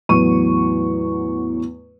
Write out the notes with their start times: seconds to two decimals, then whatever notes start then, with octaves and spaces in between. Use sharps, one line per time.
0.09 E2 A2 F#3 C#6 D#7